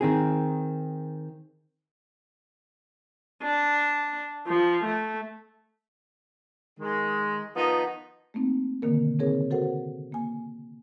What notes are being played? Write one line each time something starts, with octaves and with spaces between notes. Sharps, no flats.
D#3 C4 G#4
D4
F3
A3
D#3 G#3
D#3 F3 B3 D#4
A3 A#3 C4 D#4
B2 D3 D#3 A#3 A#4
C#3 C4 D#4 G#4 A#4 C#5
F#4 A4 A#4 C5 F#5
A#3 G#5